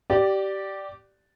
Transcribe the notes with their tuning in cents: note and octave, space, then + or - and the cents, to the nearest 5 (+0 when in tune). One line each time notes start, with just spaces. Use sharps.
G4 -20 D5 +0